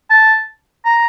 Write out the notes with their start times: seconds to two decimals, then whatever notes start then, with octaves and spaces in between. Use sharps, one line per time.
0.10 A5
0.85 A#5